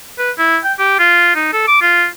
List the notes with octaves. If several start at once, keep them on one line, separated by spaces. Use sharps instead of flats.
B4
E4
G5
G4
F4
D#4
A4
D6
F4